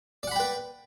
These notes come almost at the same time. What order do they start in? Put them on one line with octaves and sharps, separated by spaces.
D5 F#5 B5 G5 B4